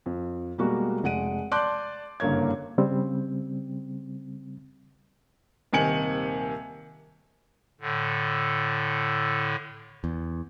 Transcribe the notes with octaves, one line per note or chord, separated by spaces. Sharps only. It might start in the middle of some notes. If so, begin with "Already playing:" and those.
F2
B2 G3 G#3 A#3 F#4
F1 G#3 F#5 D7 D#7
D5 A5 C6 D6 F#6 G6
F#1 G2 D3 A#3 C#5 G#6
C#3 G3 C4
D#1 C3 D#3 G#5 C#7 F#7
A2 D3
E2